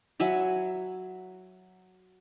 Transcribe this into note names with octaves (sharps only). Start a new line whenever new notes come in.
F#3 E5 G#5 B5